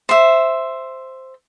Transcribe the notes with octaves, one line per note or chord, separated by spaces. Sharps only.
C5 E5